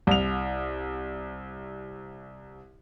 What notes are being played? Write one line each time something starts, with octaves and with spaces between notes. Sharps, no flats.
C2 F7